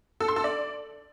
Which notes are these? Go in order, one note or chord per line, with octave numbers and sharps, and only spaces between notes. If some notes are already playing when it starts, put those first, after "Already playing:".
A4
C6
A4
D5